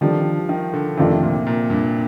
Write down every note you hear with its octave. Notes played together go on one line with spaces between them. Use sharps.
D#3 F3 G3 D4 A4
D#3
D3
F2 C3 D#3 A3 D4 F4
A#2
A#2
G2